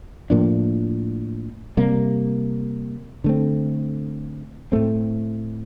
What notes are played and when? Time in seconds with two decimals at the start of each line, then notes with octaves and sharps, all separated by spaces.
0.30 A2 F3 A#3 D4
1.77 C3 G3 A#3
3.24 D3 A3 C4
4.72 A2 A3 C4